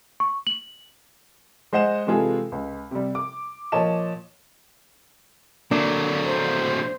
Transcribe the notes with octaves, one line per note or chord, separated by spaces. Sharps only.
C#6
F#7
G#3 C5 D#5 F#5 E7
C3 E3 G#3 F4 G#4 A4
C#2
C3 G3
D6
A#2 F3 C#5 D#5 A5 E7
F#3 A3 A#3 D4
C5